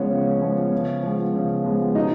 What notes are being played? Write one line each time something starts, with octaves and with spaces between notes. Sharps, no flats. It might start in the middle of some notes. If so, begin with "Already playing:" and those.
Already playing: C#3 F3 G#3 B3 C#4 C#5
C#3
F3 G#3 B3
C#3
F3 G#3 B3
C#3
F3 G#3 B3
B2 D#4 D#5